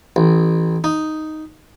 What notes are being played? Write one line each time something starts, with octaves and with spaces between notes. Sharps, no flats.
A1
D#4